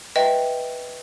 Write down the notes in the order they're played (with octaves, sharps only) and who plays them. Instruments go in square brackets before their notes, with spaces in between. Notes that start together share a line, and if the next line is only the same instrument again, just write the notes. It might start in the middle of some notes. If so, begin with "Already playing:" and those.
[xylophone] B4 D#5 E5 G5